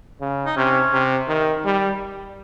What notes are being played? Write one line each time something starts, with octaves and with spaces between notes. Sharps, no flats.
C#3
D#4
C3 C#4
C3
D#3
G3